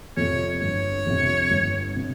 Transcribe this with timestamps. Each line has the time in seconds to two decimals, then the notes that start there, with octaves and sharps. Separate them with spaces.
0.17 F2 C3 C#5
0.61 G1 C#5
1.07 F2 C3
1.51 G1
1.96 C3